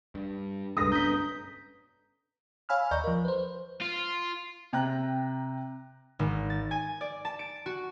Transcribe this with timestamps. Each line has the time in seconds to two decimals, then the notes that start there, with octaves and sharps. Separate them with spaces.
0.15 G2
0.77 C2 G2 G#3 D4 A4 B4 D#6 A#6
0.92 F#1 B2 C#4 A#5 G6 B6
2.69 C#5 F5 G#5 B5 E6 F6
2.91 D#2 D5 D#5 A#5 C#6 G6
3.04 F3 A#4
3.25 B4 C5
3.81 F4
4.73 C3 G5 A#5 F#6
6.19 G#1
6.50 A6
6.71 G#5
7.01 D5
7.25 A5
7.39 D7
7.66 F#4